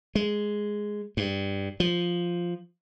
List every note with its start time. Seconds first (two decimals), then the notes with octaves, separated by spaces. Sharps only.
0.15 G#3
1.17 G2
1.80 F3